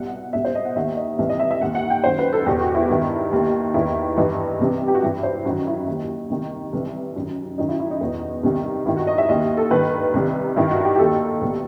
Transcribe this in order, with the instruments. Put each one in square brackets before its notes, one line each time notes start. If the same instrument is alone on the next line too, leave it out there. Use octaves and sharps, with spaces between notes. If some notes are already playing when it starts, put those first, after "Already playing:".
Already playing: [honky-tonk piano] C2 B2 F#5
C2 B2 E5
C5
D#5
F#5
D#2 D#3 E5
D#5
C2 C3 E3 E5
D#5
E5
E5
D#2 D#3 F#5
F#5
G5
F#2 D#3 C5
B4
A4
E2 B2 G4
F#4
E4
G2 D#3
D#2 D#3
E2 D#3 E4
G2 E3 D#4
C2 C3 E3
G4
F#4
G2 E3 E4
C5
F#2 D#3 F#4
E4
D#2 D#3
C2 C3 D#3
C2 C3 E3
F#2 D#3
F#2 D#3 D#4
E4
E4
D#4
E2 B2
C2 C3 D#3
G2 D#3 E4
F#4
D#5
E5
D#2 D#3 D#5
A4
G2 D#3 B4
C2 C3 D#3
G2 D#3 E4
F#4
G4
G4
D#2 D#3 A4
C2 B2